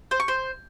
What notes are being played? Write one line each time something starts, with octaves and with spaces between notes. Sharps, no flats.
C5
C#6
C5